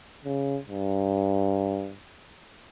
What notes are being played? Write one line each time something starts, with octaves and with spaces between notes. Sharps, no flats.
C#3
G2